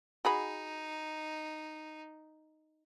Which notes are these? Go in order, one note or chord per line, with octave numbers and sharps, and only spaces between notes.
D#4 F#4 G#4 B5